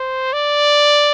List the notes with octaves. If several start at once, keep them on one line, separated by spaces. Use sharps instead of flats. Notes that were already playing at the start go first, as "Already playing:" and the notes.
Already playing: C5
D5